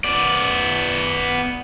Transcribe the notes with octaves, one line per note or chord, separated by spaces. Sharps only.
B3 D5